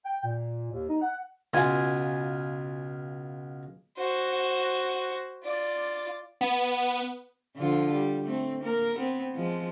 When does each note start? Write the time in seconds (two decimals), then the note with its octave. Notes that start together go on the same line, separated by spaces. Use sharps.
0.05 G5
0.24 A#2
0.72 D#2
0.89 D#4
1.01 F#5
1.53 C#2 B2 F4 F5 G#5
3.97 F#4 C5
5.44 F4 D5
6.41 B3
7.56 D3 F3 F4
7.91 G3
8.25 A3 C4
8.60 A#3 A#4
8.95 B3 C4
9.34 F3 G#3